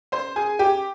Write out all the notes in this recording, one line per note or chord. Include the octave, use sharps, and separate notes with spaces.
C5 C6
G#4 G#5
G4 G5